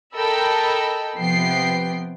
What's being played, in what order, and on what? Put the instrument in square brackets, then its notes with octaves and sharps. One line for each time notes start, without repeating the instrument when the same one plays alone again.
[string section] A4 A#4 D#5 G5 B5 E6
C3 F3 B3 G5 C7